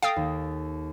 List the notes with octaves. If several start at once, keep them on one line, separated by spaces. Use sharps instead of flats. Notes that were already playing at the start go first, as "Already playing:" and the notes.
A4 F5 G5 D#6 A6 A#6
D#2